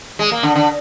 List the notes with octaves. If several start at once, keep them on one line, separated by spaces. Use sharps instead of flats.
G#3
A#3
D3
D3